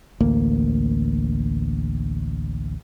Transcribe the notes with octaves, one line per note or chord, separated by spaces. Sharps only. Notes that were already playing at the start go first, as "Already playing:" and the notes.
A1 D2 A#3